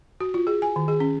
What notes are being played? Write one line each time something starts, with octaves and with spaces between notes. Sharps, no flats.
F#4
F4
G#4
G#5
D#3
G#4
C#4